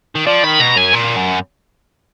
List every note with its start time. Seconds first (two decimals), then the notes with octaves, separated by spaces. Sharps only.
0.15 D#3
0.27 F3 D5
0.44 D#3 B5
0.60 B2 A#5
0.76 F#2 G#5
0.93 A#2
1.16 F#2